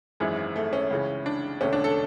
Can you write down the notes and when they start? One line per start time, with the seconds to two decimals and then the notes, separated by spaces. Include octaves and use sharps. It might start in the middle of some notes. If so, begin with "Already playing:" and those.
0.20 G#1 F#2 E3 G#3
0.56 A3
0.73 C#4
0.91 C#2 C#3 E3
1.26 D4
1.61 E1 D2 D3 C#4
1.73 D4
1.84 A4